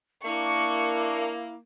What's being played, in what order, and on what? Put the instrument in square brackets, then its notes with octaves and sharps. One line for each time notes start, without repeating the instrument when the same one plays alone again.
[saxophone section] A#3 [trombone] D4 [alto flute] E4 [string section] C#6